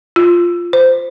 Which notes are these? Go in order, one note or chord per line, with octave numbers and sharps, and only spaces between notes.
F4
C5